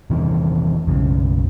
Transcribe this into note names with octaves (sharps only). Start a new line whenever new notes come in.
E2 C3 D#3 E3
B1 F#2 C#3